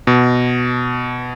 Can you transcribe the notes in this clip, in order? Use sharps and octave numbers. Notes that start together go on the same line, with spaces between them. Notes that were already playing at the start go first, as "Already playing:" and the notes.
B2